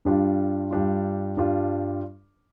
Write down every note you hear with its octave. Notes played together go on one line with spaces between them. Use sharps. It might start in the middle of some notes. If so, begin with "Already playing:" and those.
G2 G3 D4 F4
G2 G3 D4 F4
G2 G3 D4 F4